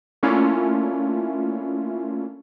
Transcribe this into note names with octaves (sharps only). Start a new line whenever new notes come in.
A3 A#3 C#4 D4 E4 F4